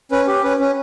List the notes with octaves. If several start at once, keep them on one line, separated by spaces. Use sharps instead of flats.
C#4 B4
G4
C#4 B4
C#4